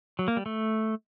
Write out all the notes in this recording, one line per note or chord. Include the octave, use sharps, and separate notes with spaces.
F#3
A#3
G3
A3